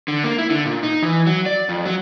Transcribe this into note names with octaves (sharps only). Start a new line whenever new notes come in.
D3
A#3
E4
D3
A#2
D#4
E3
F#3
D5
F2
F#3